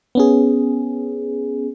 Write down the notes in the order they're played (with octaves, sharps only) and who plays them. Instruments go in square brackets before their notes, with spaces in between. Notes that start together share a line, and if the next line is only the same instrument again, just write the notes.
[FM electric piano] B3 C#4 G#4